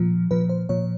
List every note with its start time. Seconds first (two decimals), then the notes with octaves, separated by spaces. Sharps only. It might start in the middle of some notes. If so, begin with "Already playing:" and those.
Already playing: A#2 F3
0.31 A#2 F3 B4
0.49 C5
0.69 A#2 F3 C#5